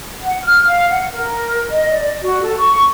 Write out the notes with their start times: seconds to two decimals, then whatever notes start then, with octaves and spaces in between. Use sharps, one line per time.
0.21 F#5
0.44 F6
0.65 F5
0.88 F#5
1.12 A#4
1.71 D#5
1.92 D5
2.21 F#4
2.42 A4
2.58 C#6